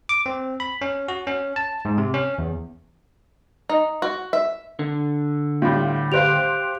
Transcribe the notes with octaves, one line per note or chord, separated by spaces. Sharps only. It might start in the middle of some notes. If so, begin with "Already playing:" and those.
D6
C4
B5
C#4
F#4
C#4
A5
G#2
C3
C#4
E2
D#4
F#4
E5
D3
A2 G3 F4
G4 C5 F5 F#6 D7 F7